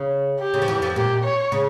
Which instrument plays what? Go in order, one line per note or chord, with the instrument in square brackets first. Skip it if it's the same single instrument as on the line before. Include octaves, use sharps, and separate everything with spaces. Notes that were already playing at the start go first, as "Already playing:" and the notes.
Already playing: [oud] C#3
[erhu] G4
[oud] C#3
F3
E2 E3
F2 F3
[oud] A#2 [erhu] G4
[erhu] C#5
[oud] C#3